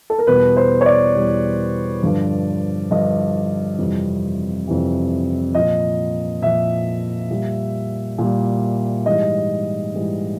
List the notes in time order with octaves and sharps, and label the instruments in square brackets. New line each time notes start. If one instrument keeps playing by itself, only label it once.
[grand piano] A4
A#4
E2 B2 G3 B4
C5
C#5
D5
E2 B2 G3
G2 D3 F3
G2 D3 F3 D#5
F2 C3 E3 G3
F2 C3 E3 G3
A#2 F3 D#5
A#2 F3 E5
A#2 G3
A#2 G3
G#2 E3 G3 D#5
G#2 E3 G3